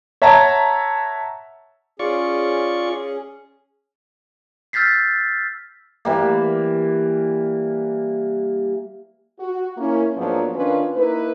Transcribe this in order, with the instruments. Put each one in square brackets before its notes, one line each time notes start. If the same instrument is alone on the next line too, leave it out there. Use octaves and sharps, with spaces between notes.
[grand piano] C#5 E5 F#5 A5 A#5
[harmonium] C#4 G#4 [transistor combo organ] F4 D5 C#6
[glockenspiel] E6 F6 G6 A6 B6 C7
[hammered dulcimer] E3 G3 A#3
[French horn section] F#4
A#3 C#4 E4
G#2 F3 F#3 A#3 B3 D4
D#3 C#4 D4 F4 B4
A#3 D#4 E4 B4